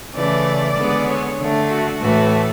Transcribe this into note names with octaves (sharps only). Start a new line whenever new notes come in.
C#3 E3 A3 D5
D3 G#3 B3
C#5
D3 A3
F#4
A2 E3 A3 F#4